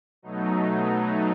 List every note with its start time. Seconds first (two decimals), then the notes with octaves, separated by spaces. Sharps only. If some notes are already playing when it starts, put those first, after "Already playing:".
0.22 B2 F#3 A3 D#4